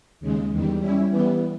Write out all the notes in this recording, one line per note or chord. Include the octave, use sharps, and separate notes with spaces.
D#2 C#3 G#3
E2 D#3 G3
G3 C#4 E4
E3 G3 B3